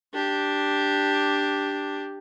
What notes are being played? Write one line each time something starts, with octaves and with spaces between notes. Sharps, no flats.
D4 G4